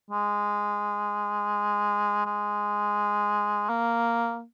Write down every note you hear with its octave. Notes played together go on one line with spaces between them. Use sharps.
G#3
G#3
A#3